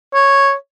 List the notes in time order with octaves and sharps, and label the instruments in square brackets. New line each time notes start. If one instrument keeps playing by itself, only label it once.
[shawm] C#5